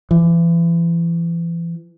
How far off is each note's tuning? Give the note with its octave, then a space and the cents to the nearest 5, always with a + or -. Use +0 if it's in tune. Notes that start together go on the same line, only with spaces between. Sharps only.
E3 +35